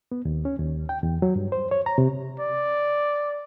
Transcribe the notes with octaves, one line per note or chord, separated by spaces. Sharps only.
B3
D#2
C#4
D#2
G5
E2
F#3
G2
C5
C#5
A#5
C3
D5